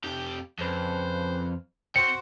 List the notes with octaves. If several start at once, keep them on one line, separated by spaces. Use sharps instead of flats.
F2 G4
F2 C#3 B4 C5
C4 F#4 C5 G5 C#7